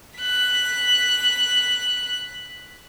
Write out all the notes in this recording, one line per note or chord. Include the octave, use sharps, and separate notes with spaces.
F#6 B6